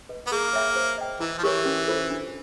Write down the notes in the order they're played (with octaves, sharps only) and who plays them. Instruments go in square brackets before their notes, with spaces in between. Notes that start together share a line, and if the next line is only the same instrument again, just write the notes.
[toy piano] B4 D#5
[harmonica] B3
[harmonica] A#3 [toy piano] G#4
[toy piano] C#5 E5 G5 B5
C5
D#5 G5
[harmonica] E3 [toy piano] E4
[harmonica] F3
[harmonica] E3 [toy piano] G4 A#4 C#5
[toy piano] C#4
F4 A4 C5
D4